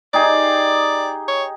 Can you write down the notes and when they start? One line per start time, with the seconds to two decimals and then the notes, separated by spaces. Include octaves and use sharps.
0.14 D#4 G4 G#4 D5
1.27 C#5